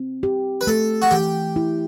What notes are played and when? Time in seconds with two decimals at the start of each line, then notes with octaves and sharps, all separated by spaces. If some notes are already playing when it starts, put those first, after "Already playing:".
Already playing: C4
0.23 G4
0.61 B4
0.67 A3 A4
1.02 F#4
1.11 E3 G4
1.56 E4